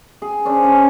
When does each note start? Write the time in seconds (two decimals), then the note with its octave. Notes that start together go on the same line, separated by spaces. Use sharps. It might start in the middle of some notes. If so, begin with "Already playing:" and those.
0.22 G#4
0.45 C#4 D4 C5
0.63 C#3 C#4